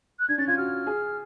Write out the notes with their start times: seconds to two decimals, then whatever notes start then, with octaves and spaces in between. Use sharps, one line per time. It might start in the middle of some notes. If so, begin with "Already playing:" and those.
0.19 F#6
0.28 D4 G#6
0.38 C#4 A6
0.48 F4 G#6
0.57 F#4 F6
0.87 G#4